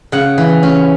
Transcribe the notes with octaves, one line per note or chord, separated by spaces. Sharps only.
C#3 F#5
E3
C#4